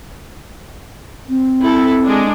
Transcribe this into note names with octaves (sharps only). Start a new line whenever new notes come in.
C4
E4 A4
G#3 D4